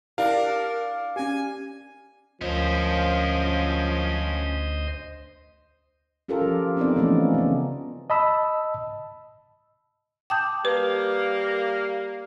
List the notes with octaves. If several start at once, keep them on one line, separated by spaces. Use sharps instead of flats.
D4 E4 G4 A#4 F5
C#4 G4 G#5
D2 F3 C#4 A#4 C5 D#5
C#4 F4 G4 A4 A#4
F3
B3 C4 D#4 A4 D5
E3 F3 A3 A#3 C#4 D#4
C#3 B3
D#5 A5 B5 E6
G5 A5 D6 D#6 G6
G3 A#3 B4